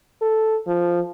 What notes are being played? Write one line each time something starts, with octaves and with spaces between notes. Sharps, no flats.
A4
F3